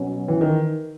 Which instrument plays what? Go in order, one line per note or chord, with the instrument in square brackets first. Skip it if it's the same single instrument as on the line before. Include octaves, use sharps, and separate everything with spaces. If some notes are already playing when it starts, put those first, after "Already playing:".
Already playing: [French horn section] B2 F#3 C#4
[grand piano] E3
D#3